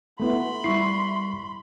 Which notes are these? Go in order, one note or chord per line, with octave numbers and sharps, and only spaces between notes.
A3 B3 E4 B5 C6
G3 E4 C#6 C7